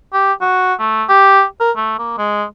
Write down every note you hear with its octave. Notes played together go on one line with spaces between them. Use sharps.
G4
F#4
A3
G4
A#4
A3
A#3
G#3